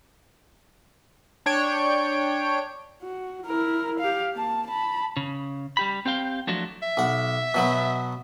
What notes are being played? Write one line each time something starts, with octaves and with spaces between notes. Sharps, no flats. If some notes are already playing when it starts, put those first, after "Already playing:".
D4 C#5 G5 D7
F#4
E4 A#4
G4 F5
A#3 A5
A5 B5
C#3
G3 G4 B5
C4 G4 F5 G5
F3 F#3 A3 D4 F4 F#4
E5
B1 F#5
B2 F#3 B3